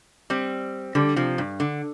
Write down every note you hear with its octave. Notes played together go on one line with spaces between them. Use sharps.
G3 C4
D3 G3
C3 F3
G2
D3